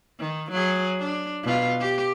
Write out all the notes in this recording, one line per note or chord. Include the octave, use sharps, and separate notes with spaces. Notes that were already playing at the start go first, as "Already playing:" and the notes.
D#3
F#3 G#4
D4
B2 F4
G4